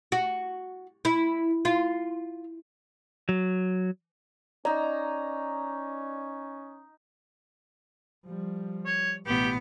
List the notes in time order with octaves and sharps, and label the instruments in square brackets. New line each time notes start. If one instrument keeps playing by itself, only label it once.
[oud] F#4
E4
F4
[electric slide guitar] F#3
[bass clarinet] C#4 [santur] D#4 A#5 [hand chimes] D5
[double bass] F3 G3
[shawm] C#5
[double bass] A1 B2 [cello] B3 [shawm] G4